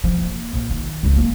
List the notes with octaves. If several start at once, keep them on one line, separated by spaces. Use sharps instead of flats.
F3
A#3
A#1
D#3
C#2 C#3
A#3